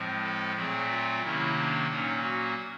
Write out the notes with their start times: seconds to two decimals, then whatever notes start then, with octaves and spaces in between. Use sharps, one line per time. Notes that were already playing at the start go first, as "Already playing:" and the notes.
Already playing: A2 F3 G#3 C4
0.22 A4
0.55 A#2 F#3 A3 C4 G#4
0.89 F4
1.22 C3 D#3 F#3 A#3 C#4 E4
1.56 D4
1.88 A#2 F#3 A#3 C#4 D#4
2.22 F#4